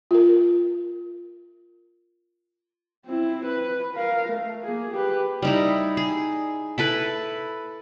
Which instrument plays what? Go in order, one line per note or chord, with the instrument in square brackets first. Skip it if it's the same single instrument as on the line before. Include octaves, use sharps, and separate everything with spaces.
[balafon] F4 A#4
[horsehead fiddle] C4 E4
B4
A#4 F5
A3
A#3 G#4
G4 B4
[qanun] G3 D#4 E4
G#4
E4 A4 B4